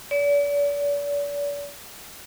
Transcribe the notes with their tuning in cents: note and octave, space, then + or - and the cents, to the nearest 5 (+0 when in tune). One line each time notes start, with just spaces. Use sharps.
D5 -40